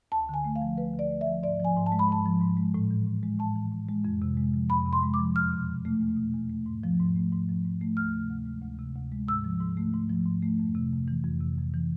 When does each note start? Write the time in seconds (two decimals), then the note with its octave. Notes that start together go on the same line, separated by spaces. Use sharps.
0.12 D2 A5
0.29 D3 G#5
0.45 A3
0.56 F5
0.62 F3
0.78 D2 B4
0.94 D3
0.99 D5
1.11 A3
1.21 E5
1.26 F3
1.43 G#2 D5
1.60 F3 G#5
1.76 G#2
1.86 A5
1.92 G#3
1.99 B5
2.09 G#2 A5
2.25 F3
2.41 G#2
2.57 G#3
2.74 A2
2.91 E3
3.06 A2
3.23 G#3
3.39 A2 A5
3.56 E3
3.71 A2
3.89 G#3
4.05 F2
4.22 C3
4.37 G#3
4.54 F3
4.70 F2 B5
4.86 C3
4.93 C6
5.03 G#3
5.14 D6
5.19 F3
5.36 E2 F6
5.53 B2
5.69 E2
5.85 A3
6.01 E2
6.17 B2
6.34 E2
6.50 A3
6.66 G#2
6.83 F3
7.00 G#2
7.16 A3
7.32 G#2
7.49 F3
7.65 G#2
7.81 A3
7.97 D2 F6
8.13 C3
8.30 D2
8.46 G#3
8.62 D2
8.79 C3
8.96 D2
9.12 G#3
9.28 G#2 E6
9.44 F3
9.61 G#2
9.77 A3
9.94 G#2
10.10 F3
10.26 G#2
10.42 A3
10.60 F2
10.75 C3
10.92 F2
11.08 E3
11.24 F2
11.41 C3
11.58 F2
11.74 E3